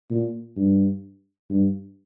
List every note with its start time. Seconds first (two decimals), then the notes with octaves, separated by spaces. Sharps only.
0.11 A#2
0.57 G2
1.50 G2